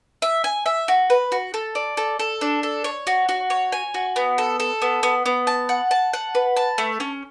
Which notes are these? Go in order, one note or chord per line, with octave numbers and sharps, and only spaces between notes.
E5
G#5
E5
F#4
B4
F#4
A4
D5
A4
A4
D4
A4
C#5
F#4
F#4
C#5
G#5
F#4
B3
A4
A4
B3
B3
B3
A5
F#5
A5
F#5
B4
A5
A3
C#4